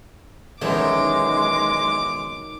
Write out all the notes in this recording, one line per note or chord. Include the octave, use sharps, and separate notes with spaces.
B1 E2 D#3 E3 F#3 G#3 C#4 D6